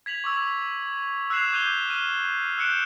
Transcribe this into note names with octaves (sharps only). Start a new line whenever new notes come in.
G#6 B6 F7 F#7
C#6 D6 E6
E6 F#6 G#6 C7 E7 F7
D6 G6 D#7 F7 G7
F6 D#7 G7
E6 F#6 G6 C#7 D7 E7